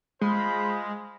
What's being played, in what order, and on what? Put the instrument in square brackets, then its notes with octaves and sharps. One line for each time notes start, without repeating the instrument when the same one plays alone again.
[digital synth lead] G#3 [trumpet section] F4 C5 B5